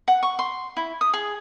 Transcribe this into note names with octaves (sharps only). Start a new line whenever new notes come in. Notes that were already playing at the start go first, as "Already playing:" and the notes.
F#5
C#6
C6
E4
D#6
G#4